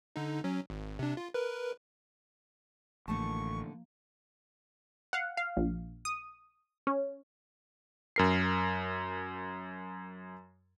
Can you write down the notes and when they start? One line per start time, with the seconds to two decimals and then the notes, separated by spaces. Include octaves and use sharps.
0.16 D3 D#4
0.44 F#3 C#4
0.70 G#1
0.99 C3 D4
1.17 F4
1.34 A#4 B4
3.08 A1 D3 F3 A3 A#3 A5 C#6
5.13 F5 F#5
5.37 F5
5.57 A#1
6.05 D#6
6.87 C#4
8.16 F#2 A#4 C7